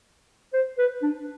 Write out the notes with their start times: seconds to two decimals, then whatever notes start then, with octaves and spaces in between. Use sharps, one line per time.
0.53 C5
0.78 B4
1.02 D4